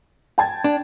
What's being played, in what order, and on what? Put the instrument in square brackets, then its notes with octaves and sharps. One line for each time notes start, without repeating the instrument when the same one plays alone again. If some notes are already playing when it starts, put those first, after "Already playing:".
[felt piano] G5 A5 G#6
[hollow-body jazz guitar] D4